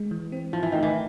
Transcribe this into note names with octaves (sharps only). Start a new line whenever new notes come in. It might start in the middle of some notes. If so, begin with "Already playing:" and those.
Already playing: G#3
E3
C4
F3 E4
E3
D#3 A3
E3